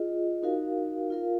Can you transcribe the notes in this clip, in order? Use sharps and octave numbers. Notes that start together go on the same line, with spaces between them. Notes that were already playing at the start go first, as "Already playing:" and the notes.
Already playing: F4 G#4 D#5
D#4 F#4 A#4 F5
F4 A#4 F5